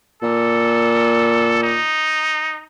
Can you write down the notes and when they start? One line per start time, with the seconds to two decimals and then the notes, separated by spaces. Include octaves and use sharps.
0.23 A#2 A4
1.63 D#4